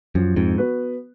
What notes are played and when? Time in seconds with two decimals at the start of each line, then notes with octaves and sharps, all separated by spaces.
0.15 F#2 F3
0.36 F2 G#2
0.58 B3 F#4 B4